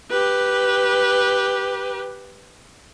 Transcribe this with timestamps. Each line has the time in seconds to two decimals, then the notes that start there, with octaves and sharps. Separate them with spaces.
0.10 G4 B4